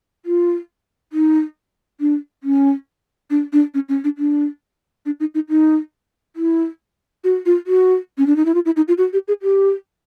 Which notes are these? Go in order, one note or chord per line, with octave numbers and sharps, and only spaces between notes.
F4
D#4
D4
C#4
D4
D4
C#4
C#4
D4
D4
D4
D#4
D#4
D#4
E4
F#4
F4
F#4
C#4
D4
D#4
E4
F4
E4
D#4
F4
F#4
G4
G#4
G4